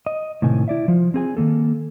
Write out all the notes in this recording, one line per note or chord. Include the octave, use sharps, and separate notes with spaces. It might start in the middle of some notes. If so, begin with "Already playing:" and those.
D#5
A2 C3 D#3 G#5
E4 D5 E5
F3 F4
C4 G#4 G#5
D#3 F#3 A#3 A4